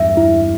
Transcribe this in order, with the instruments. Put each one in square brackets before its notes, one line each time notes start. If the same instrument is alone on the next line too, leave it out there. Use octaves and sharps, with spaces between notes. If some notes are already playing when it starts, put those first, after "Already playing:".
Already playing: [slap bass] E2 G2 [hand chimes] E5
[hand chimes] E4